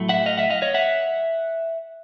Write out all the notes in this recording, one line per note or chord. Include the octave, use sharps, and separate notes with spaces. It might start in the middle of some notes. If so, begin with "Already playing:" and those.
Already playing: A2 F#3 A3
E5 F#5
D#5 F5
E5 F#5
D#5 F5
C#5 D#5
E5 F#5